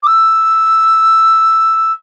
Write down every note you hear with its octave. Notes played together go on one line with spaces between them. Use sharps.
D6
E6